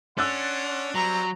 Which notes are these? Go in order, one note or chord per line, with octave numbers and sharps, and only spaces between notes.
C#4 D4 F#5 C6 E6 F#6 A6
F#3 G3 C4 A#5